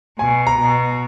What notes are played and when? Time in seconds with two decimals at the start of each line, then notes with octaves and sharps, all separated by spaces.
0.19 B2 G#5
0.47 A#5
0.61 B2